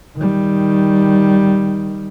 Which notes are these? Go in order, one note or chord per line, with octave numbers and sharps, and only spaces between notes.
D#3 G3